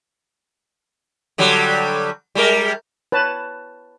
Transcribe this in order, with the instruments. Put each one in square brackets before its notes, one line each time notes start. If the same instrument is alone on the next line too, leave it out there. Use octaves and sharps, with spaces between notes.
[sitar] D3 F#3 G3
G3 G#3 A#4
[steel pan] B4 C#5 A5